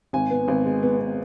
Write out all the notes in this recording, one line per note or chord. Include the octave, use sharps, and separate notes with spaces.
G#1 G#5
B3
G#1
G#3
B3
B3